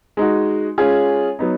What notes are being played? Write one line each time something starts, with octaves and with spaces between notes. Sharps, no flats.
G#3 D#4 F#4
G#3 C#4 F4 G#4
F#3 B3 D#4